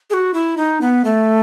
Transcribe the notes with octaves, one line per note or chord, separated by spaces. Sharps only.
G#4
F#4
E4
D#4
B3
A3